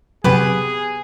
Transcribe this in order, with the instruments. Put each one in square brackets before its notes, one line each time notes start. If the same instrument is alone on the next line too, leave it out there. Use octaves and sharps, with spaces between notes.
[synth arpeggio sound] C3 F#3 [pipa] B3 G4 B4 [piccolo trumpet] G#4